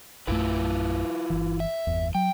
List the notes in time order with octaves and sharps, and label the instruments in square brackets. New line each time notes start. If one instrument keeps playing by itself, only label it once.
[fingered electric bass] A#1 F#2 A3 [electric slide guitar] E4 F4 B4
[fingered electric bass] G1 E3
[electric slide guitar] E5
[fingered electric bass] G1 E2
[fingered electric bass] F#3 [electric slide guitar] G5